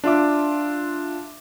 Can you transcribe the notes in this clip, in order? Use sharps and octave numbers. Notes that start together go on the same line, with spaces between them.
D4 F4 E5 D6